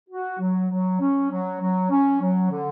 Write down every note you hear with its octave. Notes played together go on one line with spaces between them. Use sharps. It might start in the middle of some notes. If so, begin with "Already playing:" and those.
F#4
F#3
F#3
C#4
F#3
F#3
C#4
F#3
D3